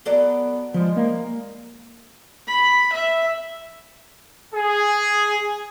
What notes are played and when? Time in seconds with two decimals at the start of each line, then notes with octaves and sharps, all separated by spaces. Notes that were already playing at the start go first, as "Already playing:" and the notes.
0.05 F#3 B3 A4 D5
0.74 F3 G3 G#3
0.96 A#3
2.48 B5
2.92 E5
4.54 G#4